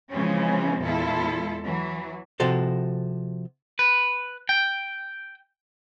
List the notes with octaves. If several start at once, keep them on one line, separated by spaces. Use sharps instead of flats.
C#3 E3 F3 G#3 C4 C#4
E2 A#2 G#3 E4 F4 A4
E3 F#3
C3 F3 F#4 A4 C5
B4
G5